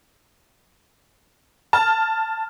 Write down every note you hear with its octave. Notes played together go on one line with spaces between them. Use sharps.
A5 F6